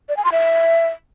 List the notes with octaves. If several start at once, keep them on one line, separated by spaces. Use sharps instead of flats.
D5
G#5
C6
E5